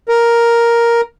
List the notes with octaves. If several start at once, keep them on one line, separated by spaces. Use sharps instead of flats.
A#4